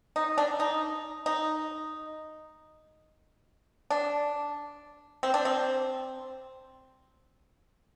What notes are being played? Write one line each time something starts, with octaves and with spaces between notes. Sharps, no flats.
D#4
D4
D#4
D#4
D4
C4
D4
C4